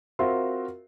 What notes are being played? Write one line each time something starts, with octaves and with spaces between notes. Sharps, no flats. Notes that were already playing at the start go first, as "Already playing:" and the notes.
C4 F4 F#4 A#4 E5 C6